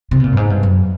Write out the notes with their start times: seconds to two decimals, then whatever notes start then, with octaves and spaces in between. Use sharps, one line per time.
0.11 C3
0.20 B2
0.24 A#2
0.32 G2
0.37 G#2
0.50 G2
0.63 F#2